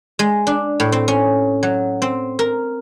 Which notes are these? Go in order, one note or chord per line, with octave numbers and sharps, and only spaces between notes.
G#3
D4
A2
C4
C#4
F#3
C4
A#4